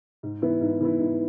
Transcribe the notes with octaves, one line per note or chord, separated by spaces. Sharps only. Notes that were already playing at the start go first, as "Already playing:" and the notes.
G#2
E3 B3 E4
G#2
E3 B3 E4
G#2